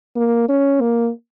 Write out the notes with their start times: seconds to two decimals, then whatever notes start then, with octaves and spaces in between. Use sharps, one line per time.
0.16 A#3
0.49 C#4
0.81 A#3